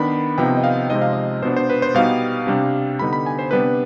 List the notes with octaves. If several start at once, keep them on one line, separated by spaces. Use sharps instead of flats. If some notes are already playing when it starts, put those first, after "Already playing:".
Already playing: D#3 B3 D4 B5
C3 F3 B3 D#4 G5
D#5
F5
C3 F3 G#3 C4 D#4 D#5
F5
D#5
B2 B3 D4 C5
C5
B4
C5
B2 G3 B3 D#4 F5
C3 G3 D4
D3 G3 B3 D#4 B5
B5
G#5
C5
C3 G3 B3 D4 B4